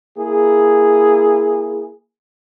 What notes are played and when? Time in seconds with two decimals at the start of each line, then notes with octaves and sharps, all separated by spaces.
0.17 A#3 E4 G#4